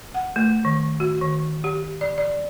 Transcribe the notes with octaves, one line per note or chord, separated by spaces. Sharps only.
F#5
A3
D#3
F#4
D#3
G4
D5
D5